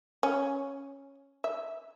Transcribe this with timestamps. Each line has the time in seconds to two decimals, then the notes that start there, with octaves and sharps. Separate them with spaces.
0.23 C#4
1.44 E5